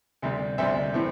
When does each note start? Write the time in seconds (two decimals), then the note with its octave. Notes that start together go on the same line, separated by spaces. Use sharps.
0.22 D2 C3 G3
0.58 D2 C3 G3 C5 E5
0.94 A2 E3 C4